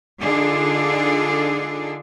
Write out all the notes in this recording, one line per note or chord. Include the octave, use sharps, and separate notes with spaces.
D3 D4 D#4 F4 G#4 A4